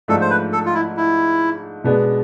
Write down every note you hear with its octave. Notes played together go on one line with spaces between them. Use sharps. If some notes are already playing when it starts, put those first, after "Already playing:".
G#2 F3 A3 D4 A4
C5
B4
A4
F4
E4
E4
B2 G#3 B3 D4